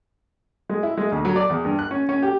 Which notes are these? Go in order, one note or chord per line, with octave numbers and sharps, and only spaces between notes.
G#3
E4
G#3
D2
F#3
D5
E2
G2
F#6
C#4
C#4
G4